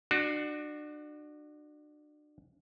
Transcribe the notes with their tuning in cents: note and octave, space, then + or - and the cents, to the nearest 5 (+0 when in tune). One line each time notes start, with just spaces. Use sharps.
D4 +30 F#4 +0